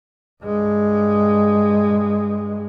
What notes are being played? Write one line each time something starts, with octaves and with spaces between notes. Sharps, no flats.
G2 G#3